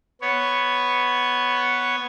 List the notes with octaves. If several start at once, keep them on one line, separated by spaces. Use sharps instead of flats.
B3 C#5